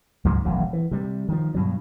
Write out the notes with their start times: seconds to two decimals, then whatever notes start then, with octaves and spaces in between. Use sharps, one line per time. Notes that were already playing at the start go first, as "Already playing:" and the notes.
0.25 C#2 G#2 F3 F#3
0.45 D#1 A1 B2 F#3
0.73 E3
0.91 C3 G3
1.29 D#3 F3
1.54 G2 B2 F#3